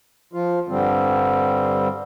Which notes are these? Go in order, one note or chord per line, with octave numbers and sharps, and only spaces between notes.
F3 F4
G2 D3 G3 C4